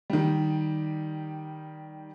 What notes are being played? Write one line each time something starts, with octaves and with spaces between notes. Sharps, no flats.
D#3 G3